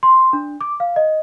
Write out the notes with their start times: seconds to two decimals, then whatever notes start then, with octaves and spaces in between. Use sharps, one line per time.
0.03 C6
0.33 D4
0.61 D6
0.80 F5
0.96 D#5